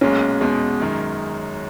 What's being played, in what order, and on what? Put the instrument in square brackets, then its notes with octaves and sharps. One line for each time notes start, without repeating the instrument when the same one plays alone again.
[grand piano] B1 A#2 G#3 [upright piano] C#4
[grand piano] E2 B2 G#3
F#2 D#3 G#3